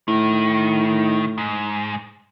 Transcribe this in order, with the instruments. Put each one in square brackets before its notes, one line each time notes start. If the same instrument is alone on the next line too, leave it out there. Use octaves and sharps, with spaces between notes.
[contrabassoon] A2 [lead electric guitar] D#3
[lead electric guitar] G#2